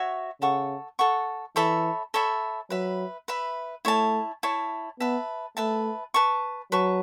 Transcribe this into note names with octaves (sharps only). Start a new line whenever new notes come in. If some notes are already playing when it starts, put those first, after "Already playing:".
Already playing: F#4 C#5 E5 C#6
C#3 A4 F#5 C#6
A4 F#5 C#6
E3 A4 C#5 E5 B5
A4 C#5 E5 B5
F#3 B4 E5 B5
B4 E5 B5
A3 E4 C#5 A5
E4 C#5 A5
B3 B4 E5 A5
A3 B4 E5 A5
B4 A5 C#6
F#3 B4 A5 C#6